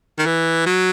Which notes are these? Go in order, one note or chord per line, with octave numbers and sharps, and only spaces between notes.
D#3
E3
F#3